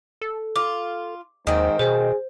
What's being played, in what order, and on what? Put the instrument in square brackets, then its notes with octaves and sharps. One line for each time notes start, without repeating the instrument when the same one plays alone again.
[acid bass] A4
[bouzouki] F4 [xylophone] D6
[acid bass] D#2 [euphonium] G#2 [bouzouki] D#3 C4
[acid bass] B2 [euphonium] G#4 [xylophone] C5